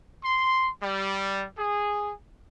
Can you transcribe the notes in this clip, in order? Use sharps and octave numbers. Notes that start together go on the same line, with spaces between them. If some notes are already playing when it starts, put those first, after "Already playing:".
C6
G3
G#4